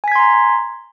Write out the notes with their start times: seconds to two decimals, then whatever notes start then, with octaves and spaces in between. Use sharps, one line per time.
0.04 G#5
0.08 B6
0.12 G#6
0.16 C6
0.19 A#5